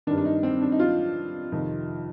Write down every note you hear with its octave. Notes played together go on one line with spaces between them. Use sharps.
G2 D#3 D4
D4
D#4
C4
D4
D#4
F4
F2 C3 D#3